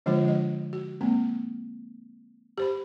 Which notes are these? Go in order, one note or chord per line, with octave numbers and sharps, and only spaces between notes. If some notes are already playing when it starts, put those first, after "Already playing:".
D3 F3 G#3 D4 F4 C5
G#3 D#5
F#4
G#3 A#3 C4
G4 C5 B5